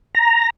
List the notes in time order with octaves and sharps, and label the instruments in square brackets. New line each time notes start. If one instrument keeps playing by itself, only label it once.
[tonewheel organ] A#5